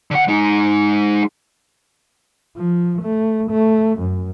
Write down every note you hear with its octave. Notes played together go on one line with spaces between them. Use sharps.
D3 F#5
G#3 D#4
F3
A3
A3
F#2